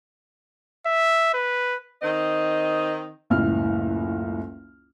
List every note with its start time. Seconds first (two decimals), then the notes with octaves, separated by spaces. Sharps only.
0.86 E5
1.34 B4
2.02 D#3 C4 D#5
3.30 F#1 C#2 A2 F6